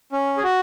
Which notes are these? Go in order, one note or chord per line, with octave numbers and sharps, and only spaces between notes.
C#4
G#4
F#4